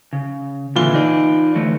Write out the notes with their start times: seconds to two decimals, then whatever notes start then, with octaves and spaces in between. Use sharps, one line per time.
0.13 C#3
0.76 A#2 D3 E3 F4 G7
0.94 D#4 D5
1.55 D3 E3 A3